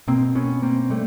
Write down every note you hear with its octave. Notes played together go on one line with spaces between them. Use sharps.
B2 A#3 C4
B3 C#4
A#3 C4
G3 A3